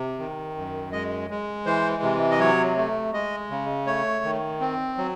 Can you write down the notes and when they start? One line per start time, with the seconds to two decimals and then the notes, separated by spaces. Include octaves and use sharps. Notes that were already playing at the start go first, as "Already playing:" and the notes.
Already playing: C3
0.19 D#3
0.56 F#2
0.92 G#3 D#5
1.30 G#3
1.66 E3 C5
2.03 C3
2.31 D#5
2.39 F#3 C#5
2.77 A3
3.13 G#3 D#5
3.50 C#3
3.87 A3 C#5
4.24 D#3
4.60 C4
4.98 F#3